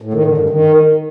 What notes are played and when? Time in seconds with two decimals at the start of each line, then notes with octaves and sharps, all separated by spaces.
0.02 A2
0.14 D#3
0.26 D3
0.38 G2
0.50 D#3